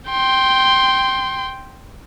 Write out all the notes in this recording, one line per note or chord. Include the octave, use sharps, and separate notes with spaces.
G5 C6